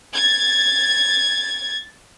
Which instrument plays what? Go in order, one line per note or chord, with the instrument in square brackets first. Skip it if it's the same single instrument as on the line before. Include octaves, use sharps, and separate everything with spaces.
[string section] G#6 A6